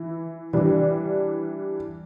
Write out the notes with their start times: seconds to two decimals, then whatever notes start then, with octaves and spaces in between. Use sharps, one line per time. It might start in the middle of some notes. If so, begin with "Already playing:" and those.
Already playing: E3 E4
0.53 E3 G3 D4